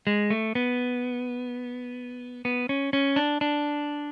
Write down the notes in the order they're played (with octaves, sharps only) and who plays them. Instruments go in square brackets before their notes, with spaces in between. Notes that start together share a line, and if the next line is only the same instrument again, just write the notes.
[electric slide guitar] G#3
A3
B3
B3
C#4
C#4
D4
D4